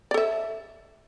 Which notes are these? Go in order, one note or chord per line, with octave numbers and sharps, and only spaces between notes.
A4 D5 E5